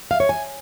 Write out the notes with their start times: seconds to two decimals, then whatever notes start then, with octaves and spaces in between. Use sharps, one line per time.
0.11 F5
0.20 C#5
0.29 G#5